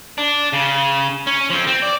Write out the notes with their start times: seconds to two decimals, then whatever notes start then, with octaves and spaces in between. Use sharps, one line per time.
0.18 D4
0.53 C#3
1.27 C#4
1.50 F3 C4
1.67 C4
1.82 D5